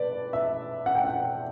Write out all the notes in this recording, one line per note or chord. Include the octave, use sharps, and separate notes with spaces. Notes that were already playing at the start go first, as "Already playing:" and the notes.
Already playing: B4 D5
E5
F#5
G5
F#5